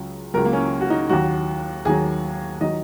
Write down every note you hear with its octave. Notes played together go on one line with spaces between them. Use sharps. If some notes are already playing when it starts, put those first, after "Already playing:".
Already playing: C#2 C#3 F#3
C#2 C#3 F#3 A#4
A#3
C#4
F#4
D#4
D#2 D#3 F#3 F#4
D#2 D#3 F#3 G#4
D#3 F#3 D#5